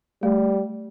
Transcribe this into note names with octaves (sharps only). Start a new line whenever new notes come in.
G3 A3